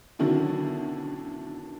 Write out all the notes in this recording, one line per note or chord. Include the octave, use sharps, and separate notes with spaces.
B2 D3 D#3 F#3 C#4 E4